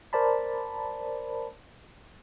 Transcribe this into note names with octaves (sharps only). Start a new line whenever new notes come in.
A#4 C5 D5 A5 B5